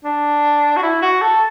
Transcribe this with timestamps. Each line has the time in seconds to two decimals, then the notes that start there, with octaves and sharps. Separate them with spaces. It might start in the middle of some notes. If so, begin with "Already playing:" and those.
0.05 D4
0.77 F#4
0.83 E4
1.02 F#4
1.21 A4